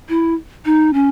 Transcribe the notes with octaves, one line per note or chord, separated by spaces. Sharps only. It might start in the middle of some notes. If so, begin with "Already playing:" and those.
E4
D#4
C#4